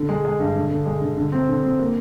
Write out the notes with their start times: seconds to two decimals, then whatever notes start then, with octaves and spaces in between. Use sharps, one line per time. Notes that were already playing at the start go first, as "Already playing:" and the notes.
Already playing: D3
0.09 G#3
0.25 G#3
0.40 G2
0.55 D3
0.70 D3
0.86 G#3
1.01 D3
1.17 D3
1.32 C4
1.48 D3
1.63 C4
1.79 A#3